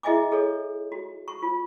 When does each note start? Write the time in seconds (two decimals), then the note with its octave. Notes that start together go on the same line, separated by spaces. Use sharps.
0.03 E4 G#4 D#5 E5 G#5 D6
0.32 G#4 A4 C#5
0.92 F#4
1.28 C#6
1.42 F4